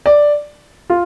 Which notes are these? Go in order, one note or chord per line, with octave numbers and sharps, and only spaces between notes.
D5
F4